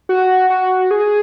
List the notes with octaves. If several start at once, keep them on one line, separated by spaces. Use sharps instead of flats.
F#4
F#4
G#4